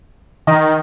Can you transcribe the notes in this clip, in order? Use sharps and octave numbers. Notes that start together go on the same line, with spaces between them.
D#3 D#5